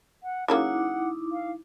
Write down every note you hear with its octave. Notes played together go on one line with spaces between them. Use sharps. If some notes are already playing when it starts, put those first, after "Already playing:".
F#5
C#3 F#3 A#3 D#4 E4 F#5 D6
F5